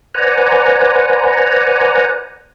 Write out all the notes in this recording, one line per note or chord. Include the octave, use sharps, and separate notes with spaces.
B4 C5 D5 F#5 G#5 A#5